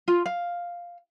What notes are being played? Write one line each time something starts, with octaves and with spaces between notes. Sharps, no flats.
F4
F5